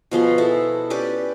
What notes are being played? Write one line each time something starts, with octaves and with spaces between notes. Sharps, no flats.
B2 F3 G#4 C6
E4 A4
C#4 G4 B4 D5